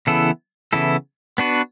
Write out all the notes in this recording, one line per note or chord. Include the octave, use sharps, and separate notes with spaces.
C#3 E3 B3 E4 A4
C#3 E3 B3 E4 A4
B3 D4 F#4 B4